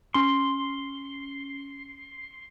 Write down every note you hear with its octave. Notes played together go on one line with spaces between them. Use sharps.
C#4 C6 G7